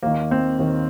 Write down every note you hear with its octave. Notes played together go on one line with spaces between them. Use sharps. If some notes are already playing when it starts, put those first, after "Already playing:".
D#2 D#3 A#3
C4
D#2 D#3